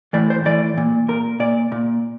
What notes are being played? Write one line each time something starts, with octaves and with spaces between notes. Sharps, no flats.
A2 E3 D5
C5
A2 E3 D5
A#2
A#2 A#4
A#2 D5
A#2